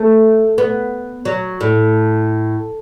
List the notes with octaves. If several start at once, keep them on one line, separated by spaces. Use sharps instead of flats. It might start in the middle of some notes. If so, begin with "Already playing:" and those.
Already playing: A3
B3
F#3
A2